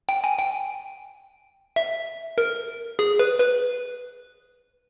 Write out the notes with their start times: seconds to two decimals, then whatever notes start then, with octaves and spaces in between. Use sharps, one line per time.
0.09 G5
0.24 G#5
0.39 G5
1.76 E5
2.38 A#4
2.99 G#4
3.19 B4
3.40 B4